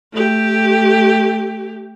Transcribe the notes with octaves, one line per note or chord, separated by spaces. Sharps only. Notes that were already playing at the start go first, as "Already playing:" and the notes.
A3 G4